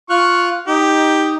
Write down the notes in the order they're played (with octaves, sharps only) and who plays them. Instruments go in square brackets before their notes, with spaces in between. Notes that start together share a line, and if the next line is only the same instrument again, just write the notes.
[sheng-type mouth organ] F4 F6 F#6 [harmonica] C#6
[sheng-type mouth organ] D#4 [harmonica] G4